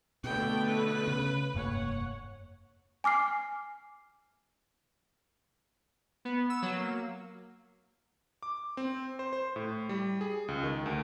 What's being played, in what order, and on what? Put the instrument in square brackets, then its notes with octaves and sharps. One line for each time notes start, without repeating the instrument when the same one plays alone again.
[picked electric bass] B2 [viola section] D3 A3 B3 [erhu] G5
[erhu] B4
[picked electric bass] C#3
[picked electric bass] F1 G2 A#3 [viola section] C#5 F#5
[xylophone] G#5 D6 F6 C7
[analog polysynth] B3
E6
F#3
A#3
[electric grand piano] D6
C4
C5
C5
A2
G3
G#4
C#2
D#3
D2